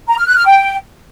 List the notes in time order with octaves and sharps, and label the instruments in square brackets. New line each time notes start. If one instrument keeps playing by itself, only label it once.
[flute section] A#5
F6
F#6
F6
G5